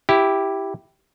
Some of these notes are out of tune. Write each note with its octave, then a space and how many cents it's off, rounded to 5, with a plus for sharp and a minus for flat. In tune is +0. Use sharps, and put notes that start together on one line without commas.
E4 +0 G4 +0